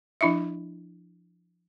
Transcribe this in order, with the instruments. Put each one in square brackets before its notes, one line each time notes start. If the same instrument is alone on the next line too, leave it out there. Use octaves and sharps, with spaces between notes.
[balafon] F3 D4 E4 D#5 E5